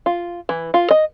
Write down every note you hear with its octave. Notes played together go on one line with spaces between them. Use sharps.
F4
E3
F4
D#5